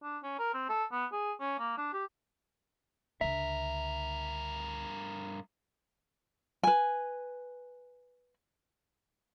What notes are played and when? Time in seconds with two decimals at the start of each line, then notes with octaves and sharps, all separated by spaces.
0.03 D4
0.23 C#4
0.39 A#4
0.54 C4
0.69 A4
0.92 B3
1.12 G#4
1.40 C#4
1.59 A#3
1.78 D4
1.93 G4
3.21 C#2 G2 D3 A#4 E5
6.63 B4 G#5